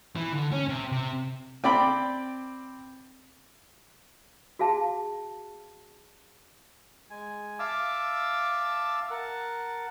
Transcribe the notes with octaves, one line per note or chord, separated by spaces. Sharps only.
E3
D3
C#4
C3
C3
C4 D5 G5 B5
F#4 G#4 F5 A5
G#3 G#5
E5 F5 A5 D6 E6
A#4 F#5 A5